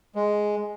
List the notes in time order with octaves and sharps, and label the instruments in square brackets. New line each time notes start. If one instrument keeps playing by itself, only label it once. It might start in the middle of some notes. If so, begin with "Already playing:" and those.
[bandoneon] G#3